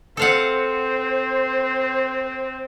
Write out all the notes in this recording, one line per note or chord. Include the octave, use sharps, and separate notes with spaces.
C4 A4 C5 F5 F#5